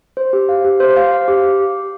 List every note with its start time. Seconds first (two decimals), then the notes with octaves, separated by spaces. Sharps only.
0.17 C5
0.33 G4
0.49 F5
0.65 G4
0.80 C5
0.96 F5
1.12 F5
1.28 G4